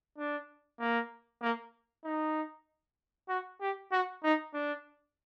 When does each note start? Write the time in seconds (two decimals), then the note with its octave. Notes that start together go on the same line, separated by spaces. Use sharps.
0.18 D4
0.80 A#3
1.42 A#3
2.04 D#4
3.29 F#4
3.61 G4
3.92 F#4
4.24 D#4
4.54 D4